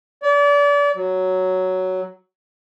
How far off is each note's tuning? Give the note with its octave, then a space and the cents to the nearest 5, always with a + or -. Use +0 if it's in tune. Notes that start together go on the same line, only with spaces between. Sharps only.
D5 -35
F#3 +5